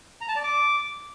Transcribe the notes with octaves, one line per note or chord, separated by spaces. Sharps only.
A#5
A5
D5
D6